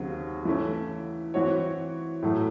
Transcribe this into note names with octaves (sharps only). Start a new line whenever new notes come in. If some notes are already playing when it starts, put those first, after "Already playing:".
Already playing: D#2 C#3 F#3 C4 F#4
E3 A3 C#4
E3 C4 F#4 C#5
A2 F#3 A3